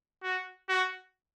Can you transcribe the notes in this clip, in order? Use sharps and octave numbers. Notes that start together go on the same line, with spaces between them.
F#4
F#4